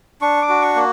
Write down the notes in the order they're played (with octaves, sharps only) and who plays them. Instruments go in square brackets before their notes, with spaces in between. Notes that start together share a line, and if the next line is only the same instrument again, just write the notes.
[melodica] D4 C#6
D6
F#4
C#6
A#3